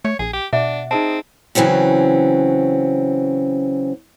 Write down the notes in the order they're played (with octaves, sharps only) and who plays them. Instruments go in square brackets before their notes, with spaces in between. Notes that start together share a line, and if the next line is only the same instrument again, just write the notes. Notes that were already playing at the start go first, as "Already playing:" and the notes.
[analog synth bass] A3 [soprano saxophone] C#5
[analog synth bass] A#1 [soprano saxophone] G#4
[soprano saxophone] G4
[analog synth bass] B2 [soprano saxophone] D4 [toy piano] E5 [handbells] F#5 D6
[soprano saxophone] C4 [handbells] D#4 G#4 D#5 [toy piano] A5
[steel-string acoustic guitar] C#3 E3 F#3 C4 C#4